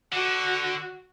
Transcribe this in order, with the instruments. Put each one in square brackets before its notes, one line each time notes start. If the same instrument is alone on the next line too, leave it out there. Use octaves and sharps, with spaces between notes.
[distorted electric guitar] D3 [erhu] F#4